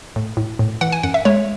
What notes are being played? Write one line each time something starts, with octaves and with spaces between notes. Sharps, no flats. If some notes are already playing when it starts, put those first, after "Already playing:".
A2
A2
A2
E3 F#5
G#5
F#2 F#5
E5
G#3 C#5